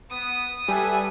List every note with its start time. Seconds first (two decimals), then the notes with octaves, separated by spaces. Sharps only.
0.10 B3 D#6
0.68 G3 A4 B4 E5 G#5